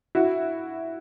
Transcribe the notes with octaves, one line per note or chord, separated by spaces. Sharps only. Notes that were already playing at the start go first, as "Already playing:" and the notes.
E4 F#4